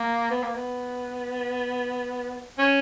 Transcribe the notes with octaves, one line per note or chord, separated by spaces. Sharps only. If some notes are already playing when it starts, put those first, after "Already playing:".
Already playing: A#3
B3
A#3
B3
C#4